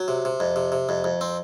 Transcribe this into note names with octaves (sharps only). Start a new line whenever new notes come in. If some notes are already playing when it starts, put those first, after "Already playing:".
Already playing: F#3
C3
C3
F2
C3
C3
F2
F2
C4